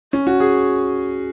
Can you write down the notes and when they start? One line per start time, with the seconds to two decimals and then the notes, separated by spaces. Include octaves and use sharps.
0.13 C#4
0.27 F#4
0.40 G#4